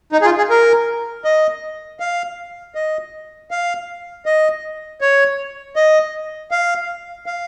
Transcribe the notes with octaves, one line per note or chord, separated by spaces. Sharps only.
D#4
G#4
F4
G#4
A#4
D#5
F5
D#5
F5
D#5
C#5
D#5
F5
F5